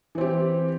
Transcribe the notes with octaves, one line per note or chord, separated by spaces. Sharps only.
E3 C4 G4